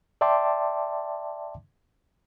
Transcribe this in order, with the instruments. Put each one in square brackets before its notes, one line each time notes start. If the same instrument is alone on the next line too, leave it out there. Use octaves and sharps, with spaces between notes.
[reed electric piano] D5 E5 G5 A5 C6 D6